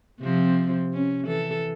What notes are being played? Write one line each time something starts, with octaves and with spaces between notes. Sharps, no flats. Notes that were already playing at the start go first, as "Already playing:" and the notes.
C3 F3 C4
C#4
E3 A4